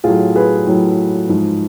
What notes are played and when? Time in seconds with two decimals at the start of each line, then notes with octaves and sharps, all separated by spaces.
0.04 A2 F#3 F4 G#4
0.35 G#4 B4
0.67 A2 F#3
1.29 G#2 F3